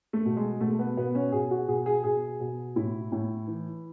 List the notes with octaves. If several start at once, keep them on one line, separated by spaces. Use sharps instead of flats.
A3
B2
G#3
B2 A3
B3
B2 B3
C#4
B2 G#4
F#4
B2 G#4
G#4
B2 G#4
B2
A2 E4
A2
E3